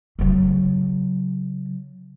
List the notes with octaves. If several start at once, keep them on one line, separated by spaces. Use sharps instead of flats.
C#3 F#3